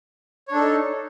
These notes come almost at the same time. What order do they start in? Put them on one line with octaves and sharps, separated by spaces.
C#5 D4 A4 D#4